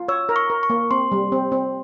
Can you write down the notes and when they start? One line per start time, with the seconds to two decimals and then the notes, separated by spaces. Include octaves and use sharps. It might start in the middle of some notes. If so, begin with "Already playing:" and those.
Already playing: F4
0.08 C#5 E6
0.29 A#4
0.36 C#6
0.50 A#4
0.63 C#6
0.70 A#3
0.91 C4 C6
1.12 G3
1.32 C4
1.52 C4